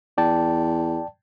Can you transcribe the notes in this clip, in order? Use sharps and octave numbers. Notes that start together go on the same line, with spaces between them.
E2 D5 G5 A5